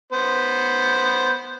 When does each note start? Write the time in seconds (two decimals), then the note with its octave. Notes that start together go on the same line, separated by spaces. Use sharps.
0.13 B3 C5